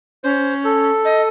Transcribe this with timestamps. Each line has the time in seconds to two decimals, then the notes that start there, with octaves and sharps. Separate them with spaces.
0.24 C#4 C5
0.65 A4
1.05 D#5